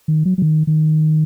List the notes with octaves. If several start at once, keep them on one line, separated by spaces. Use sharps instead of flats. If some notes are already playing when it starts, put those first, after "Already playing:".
D#3
F#3
F#3
D#3
D#3